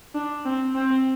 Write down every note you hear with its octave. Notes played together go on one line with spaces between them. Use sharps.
D4
C4
C4